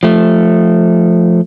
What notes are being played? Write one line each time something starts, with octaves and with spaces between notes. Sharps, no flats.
F3 A3